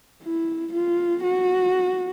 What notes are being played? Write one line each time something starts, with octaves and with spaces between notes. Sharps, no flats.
E4
F4
F#4